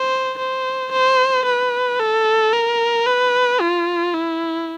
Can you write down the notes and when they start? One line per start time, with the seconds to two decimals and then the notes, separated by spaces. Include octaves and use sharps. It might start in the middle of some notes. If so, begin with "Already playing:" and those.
Already playing: C5
0.39 C5
0.92 C5
1.46 B4
2.00 A4
2.53 A#4
3.06 B4
3.61 F4
4.14 E4